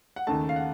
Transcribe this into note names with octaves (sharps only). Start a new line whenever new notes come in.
F#5
D#2 C#3 A3 A5
F5
F#5